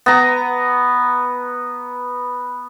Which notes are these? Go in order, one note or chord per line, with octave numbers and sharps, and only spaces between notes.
B3 A#5